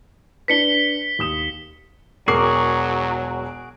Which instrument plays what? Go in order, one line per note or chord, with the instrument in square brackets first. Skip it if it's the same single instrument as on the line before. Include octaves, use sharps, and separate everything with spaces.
[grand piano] D4 B4 [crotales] B6 C#7 G7
[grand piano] D#2 D#6 E7
[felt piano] E1 A#4 C7 [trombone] F#3 [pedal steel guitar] F#4 G#4 D6